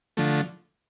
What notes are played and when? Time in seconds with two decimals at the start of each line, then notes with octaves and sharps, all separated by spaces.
0.17 D3 F3 A3